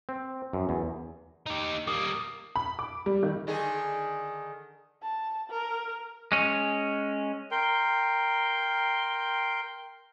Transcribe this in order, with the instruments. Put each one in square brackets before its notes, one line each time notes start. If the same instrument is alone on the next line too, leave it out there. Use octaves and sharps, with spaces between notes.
[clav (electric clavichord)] C4
F#2
E2
[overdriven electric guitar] D#4 G4
[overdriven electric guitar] G3 A#3 [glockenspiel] D6 D#6
[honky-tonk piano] B5
D6
G3
D#3
[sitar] D3 D#3 G#4
[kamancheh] A5
A#4
[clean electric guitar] G#3 C#4
[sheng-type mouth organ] A#4 G5 C6